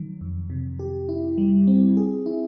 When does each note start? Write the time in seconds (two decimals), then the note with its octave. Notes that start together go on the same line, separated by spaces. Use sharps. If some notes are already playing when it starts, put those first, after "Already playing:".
Already playing: D#3 F#3
0.21 F2
0.50 C3
0.79 G4
1.09 E4
1.38 G3
1.67 C4
1.97 G#4
2.26 E4